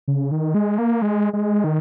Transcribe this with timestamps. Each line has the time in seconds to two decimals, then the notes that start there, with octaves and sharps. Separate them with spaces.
0.08 C#3
0.31 D#3
0.54 G#3
0.78 A#3
1.02 G#3
1.33 G#3
1.64 D#3